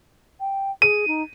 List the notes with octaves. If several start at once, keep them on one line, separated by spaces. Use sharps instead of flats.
G5
G#4 D#7
D#4